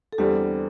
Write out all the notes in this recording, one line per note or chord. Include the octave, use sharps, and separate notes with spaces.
A4
E2 D3 G3 C4 G4